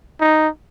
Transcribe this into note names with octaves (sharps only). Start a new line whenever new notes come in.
D#4